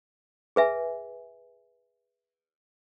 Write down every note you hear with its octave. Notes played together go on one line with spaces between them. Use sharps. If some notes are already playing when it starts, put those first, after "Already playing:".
G#4 B4 E5 G#5